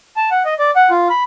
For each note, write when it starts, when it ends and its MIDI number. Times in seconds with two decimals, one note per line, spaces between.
0.17 0.29 81
0.31 0.43 78
0.45 0.54 75
0.59 0.71 74
0.76 0.90 78
0.90 1.08 65
1.10 1.23 83